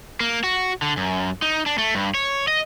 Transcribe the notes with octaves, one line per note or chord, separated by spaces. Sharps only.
A#3
F#4
D3
F#2
D#4
D4
A3
G2
C#5
D#5